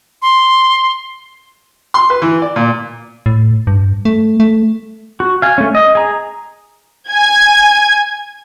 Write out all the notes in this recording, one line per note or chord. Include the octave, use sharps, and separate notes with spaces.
C6
C6
B4
E3
D5
A#2
A2
G2
A3
A3
F#4
F5 G#5
A3 C#4
D#5
G#4 A#5
G#5 G#6